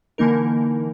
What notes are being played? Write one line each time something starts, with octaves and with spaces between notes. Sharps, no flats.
D3 E3 A#3 D#4 A#4